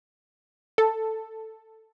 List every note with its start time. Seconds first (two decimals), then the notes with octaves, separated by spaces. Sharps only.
0.78 A4